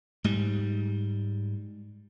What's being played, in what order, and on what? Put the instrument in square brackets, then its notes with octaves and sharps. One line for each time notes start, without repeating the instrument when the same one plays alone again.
[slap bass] G#2 G3